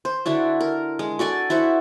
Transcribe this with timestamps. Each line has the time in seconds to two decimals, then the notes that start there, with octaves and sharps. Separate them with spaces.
0.05 C5
0.26 D3 D4 E4 F#4
0.60 A#4
0.99 G#3
1.19 F#4 A4 D5 G#5
1.50 E4 F#4 C5 F#5